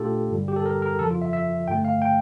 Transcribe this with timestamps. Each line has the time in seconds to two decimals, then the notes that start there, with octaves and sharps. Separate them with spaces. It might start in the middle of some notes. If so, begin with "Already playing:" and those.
Already playing: A#2 A3 D4 F4 G4 A4
0.31 G2 D3 G3
0.48 G4
0.56 A4
0.66 A#4
0.82 A#4
0.99 F2 C#3 F3 A4
1.11 F4
1.22 E5
1.33 E5
1.68 G2 D3 A3 G5
1.85 F5
2.02 G5